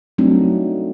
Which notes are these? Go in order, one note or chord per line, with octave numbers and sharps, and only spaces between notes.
F#3 G3 A3 C4 D4 D#4